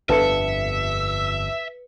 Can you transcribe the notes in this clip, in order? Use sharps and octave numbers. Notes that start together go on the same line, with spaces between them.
G1 F2 B3 D4 A4 B4 E5 C#7